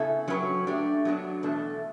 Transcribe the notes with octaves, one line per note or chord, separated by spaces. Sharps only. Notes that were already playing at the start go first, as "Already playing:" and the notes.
Already playing: C#3 B3 E4 A4
F#3 C#4 G4 B4
A3 D4 G4 D5
F#3 B3 D4
E2 B2 A3 D4 A4